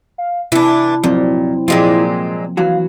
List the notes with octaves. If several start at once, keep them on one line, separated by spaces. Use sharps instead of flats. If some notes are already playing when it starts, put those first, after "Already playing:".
F5
C3 E3 D4 E4
F2 A#2 F3 F#3 C4
A#2 F3 G#3 A#3 C4 F4 G4
E3 F#3 F#4 F5